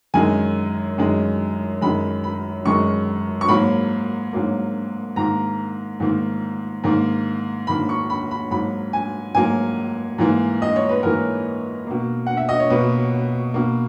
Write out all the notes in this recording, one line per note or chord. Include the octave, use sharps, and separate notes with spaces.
F#2 D#3 G#3 G#5
F#2 D#3 G#3
F#2 D#3 G#3 B5
B5
F#2 D#3 G#3 C#6
C#6
G#2 F#3 A#3 B5
G#2 F#3 A#3
G#2 D#3 A#3 A#5
G#2 D#3 A#3
G#2 D#3 A#3
G#2 D#3 A#3 B5
C#6
B5
B5
G#2 F#3 A#3 B5
G#5
G#2 F#3 A#3 G#5
G#2 E3 A#3
D#5
C#5
B4
G#2 E3 A#3 A#4
B2 A#3
F#5
E5
D#5
C#5
B2 A#3 B4
B2 A#3